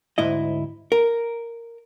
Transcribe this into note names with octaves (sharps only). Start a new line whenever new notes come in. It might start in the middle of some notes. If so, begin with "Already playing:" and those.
D2 G#2 E4 D#5
A#4